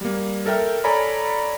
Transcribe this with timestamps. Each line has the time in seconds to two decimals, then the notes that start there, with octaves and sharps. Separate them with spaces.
0.01 G3 A#3
0.46 A4 A#4 E5 G5 F6
0.84 A4 C#5 D5 G#5 A#5 B5